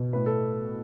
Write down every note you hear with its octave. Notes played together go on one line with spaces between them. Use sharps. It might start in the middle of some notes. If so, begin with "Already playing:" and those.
Already playing: B2
A2 B4
A4